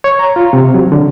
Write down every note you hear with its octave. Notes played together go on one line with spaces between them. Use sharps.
C#5
A#5
F4
C3
F#3
D3